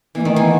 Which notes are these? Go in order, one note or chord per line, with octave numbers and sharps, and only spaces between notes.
E3 B3
D#3 A3
E3
B3